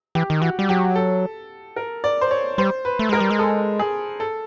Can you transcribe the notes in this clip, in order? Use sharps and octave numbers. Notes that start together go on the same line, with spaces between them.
E3 G4
D#3
E3 F#4
G3
F#3 G4
A4
A#4
D5
C5
C#5
G3 C5
B4
A3
G#3 A#4
G3
G#3
A4
G#4
A4